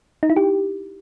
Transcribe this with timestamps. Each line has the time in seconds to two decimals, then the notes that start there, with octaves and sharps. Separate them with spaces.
0.23 D#4
0.30 E4
0.36 G4